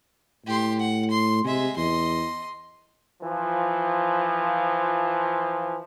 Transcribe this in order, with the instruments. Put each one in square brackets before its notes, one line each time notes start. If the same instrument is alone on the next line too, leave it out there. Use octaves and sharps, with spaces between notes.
[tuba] A2 [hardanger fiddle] G4 C6
[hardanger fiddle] F#5
C6
[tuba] C3 [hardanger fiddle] G#3 E5
[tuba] E2 [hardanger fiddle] D#5 C6
[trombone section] E3 F3